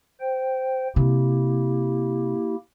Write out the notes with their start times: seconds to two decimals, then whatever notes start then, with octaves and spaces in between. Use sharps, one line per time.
0.21 C5 G5
0.96 C3 A#3 E4 G4